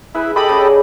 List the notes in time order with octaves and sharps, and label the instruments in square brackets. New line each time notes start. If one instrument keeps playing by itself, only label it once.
[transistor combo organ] E4 [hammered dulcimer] G#4 B4
[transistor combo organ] G4 A4 D#5 [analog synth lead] B5
[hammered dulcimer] C#3 D5 E5